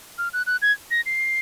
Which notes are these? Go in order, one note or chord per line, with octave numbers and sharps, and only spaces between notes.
F6
F#6
F#6
G#6
A#6
C7